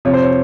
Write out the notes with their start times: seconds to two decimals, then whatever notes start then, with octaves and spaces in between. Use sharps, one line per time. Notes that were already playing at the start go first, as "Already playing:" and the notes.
0.05 F2 C3 F3 C#5
0.14 C5
0.22 C#5